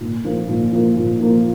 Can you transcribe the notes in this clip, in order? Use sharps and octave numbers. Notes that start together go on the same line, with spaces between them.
A#2
F3 A#3 F4
A#2
F3 A#3 F4
A#2
F3 A#3 F4